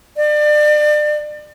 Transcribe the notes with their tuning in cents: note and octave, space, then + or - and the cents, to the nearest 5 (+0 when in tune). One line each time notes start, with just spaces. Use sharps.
D5 +30